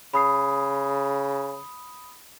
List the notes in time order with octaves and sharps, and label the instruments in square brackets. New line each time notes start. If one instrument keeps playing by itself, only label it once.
[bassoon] C#3 [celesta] B5 D#6 C7